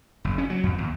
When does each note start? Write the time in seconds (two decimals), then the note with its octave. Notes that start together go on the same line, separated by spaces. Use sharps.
0.25 F#1
0.38 C#4
0.50 F#3
0.63 F2
0.78 D#2